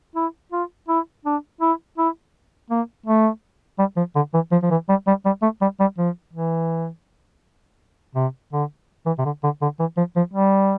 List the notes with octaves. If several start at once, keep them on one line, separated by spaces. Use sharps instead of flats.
E4
F4
E4
D4
E4
E4
A#3
A3
G3
F3
D3
E3
F3
F3
E3
G3
G3
G3
A3
G3
G3
F3
E3
C3
D3
E3
C3
D3
D3
D3
E3
F3
F3
G3